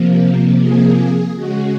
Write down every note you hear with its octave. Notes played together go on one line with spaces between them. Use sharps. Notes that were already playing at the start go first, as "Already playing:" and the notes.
Already playing: C3 F3 A#3
G#4
C#3 G#3 F#4